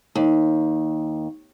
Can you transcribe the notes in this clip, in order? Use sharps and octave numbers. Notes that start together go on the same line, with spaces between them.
D#2